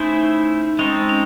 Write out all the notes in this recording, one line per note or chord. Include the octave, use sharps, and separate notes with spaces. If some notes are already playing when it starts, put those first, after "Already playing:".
Already playing: A3 C#4 D#4 E4 G#4 C5
G#3 C4 C#4 D#4 A4
C#4